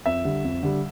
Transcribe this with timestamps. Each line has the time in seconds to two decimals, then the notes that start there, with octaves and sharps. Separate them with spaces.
0.06 F2 E5
0.25 D3 G3
0.44 F2
0.63 D3 G3